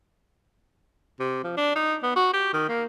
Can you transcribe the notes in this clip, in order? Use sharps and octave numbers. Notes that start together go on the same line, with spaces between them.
C3
F3
D4
D#4
B3
F#4
G4
D#3
A#3